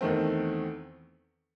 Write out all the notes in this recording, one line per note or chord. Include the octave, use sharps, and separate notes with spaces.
E2 D#3 A3 C4